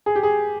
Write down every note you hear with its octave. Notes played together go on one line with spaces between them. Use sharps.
G#4
G4
G#4